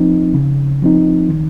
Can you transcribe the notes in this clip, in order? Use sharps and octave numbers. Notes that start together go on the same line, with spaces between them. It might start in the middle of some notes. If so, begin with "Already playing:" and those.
Already playing: F3 C4 D#4
C#3
F3 C4 D#4
D#3